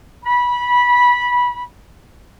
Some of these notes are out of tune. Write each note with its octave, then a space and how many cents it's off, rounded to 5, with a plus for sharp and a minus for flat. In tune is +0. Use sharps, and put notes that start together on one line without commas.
B5 -15